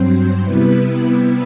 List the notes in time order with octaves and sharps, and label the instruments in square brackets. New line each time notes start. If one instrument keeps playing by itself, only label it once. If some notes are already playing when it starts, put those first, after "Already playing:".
Already playing: [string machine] G2 F#3 C4 C5
C3 G3 B3 E4 B4